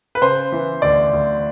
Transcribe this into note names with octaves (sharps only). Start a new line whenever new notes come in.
B4
C#3 C5
E3
D2 D5
D2